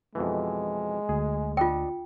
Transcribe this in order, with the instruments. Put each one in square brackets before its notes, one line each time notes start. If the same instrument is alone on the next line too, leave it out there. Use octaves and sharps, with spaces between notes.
[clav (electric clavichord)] F2 B2 E3 [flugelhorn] G#3
[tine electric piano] D2 [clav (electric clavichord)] G#4
[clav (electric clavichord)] D4 D#5 [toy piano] F4 G5